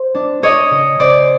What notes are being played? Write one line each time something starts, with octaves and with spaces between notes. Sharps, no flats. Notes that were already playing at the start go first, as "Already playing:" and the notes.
Already playing: C5
D4
D4 C#5 D#5
C#3
C#3 C5 D5